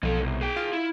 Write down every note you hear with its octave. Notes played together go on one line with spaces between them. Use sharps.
B1 F3 A4
C2
G#4 G5
F4
E4